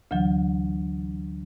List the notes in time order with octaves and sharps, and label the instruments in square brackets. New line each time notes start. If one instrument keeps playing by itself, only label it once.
[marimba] D2 D3 E3 F#3